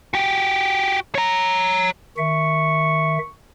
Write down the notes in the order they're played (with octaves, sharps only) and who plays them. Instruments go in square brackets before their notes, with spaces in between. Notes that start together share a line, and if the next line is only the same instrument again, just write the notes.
[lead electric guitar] F#4 G4
C#5 A#5
[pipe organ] D#3 E5 [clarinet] C#6